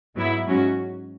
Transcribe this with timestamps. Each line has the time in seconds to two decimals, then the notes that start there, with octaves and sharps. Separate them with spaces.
0.15 G#2 F#3 B3 E4
0.46 G#2 F#3 C#4 F#4